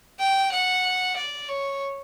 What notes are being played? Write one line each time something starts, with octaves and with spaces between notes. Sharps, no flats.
G5
F#5
D5
C#5